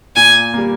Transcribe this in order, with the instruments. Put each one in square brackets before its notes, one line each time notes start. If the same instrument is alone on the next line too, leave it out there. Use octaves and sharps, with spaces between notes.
[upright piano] A#2 [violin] G#5
[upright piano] G3 A#3